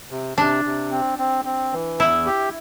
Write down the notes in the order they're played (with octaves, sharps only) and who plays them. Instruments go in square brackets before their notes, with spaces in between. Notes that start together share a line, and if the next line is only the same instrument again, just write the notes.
[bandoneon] C3
[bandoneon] C3 [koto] D4
[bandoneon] C3
C4
C4
C4
E3
[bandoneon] E2 [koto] E4
[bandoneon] G4